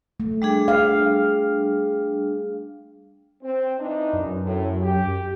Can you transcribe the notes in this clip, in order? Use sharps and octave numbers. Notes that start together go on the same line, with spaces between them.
A3
G3 D4 G#4
F5
C4
E3 D4 D#4
F#2
A2
G4